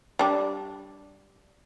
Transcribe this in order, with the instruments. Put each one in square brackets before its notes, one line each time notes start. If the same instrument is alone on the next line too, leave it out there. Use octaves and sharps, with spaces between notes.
[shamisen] G3 D4